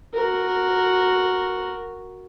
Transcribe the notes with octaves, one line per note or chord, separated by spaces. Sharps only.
F#4 A#4